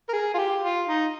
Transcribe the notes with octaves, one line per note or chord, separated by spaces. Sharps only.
A#4
G#4
F4
G4
F4
D#4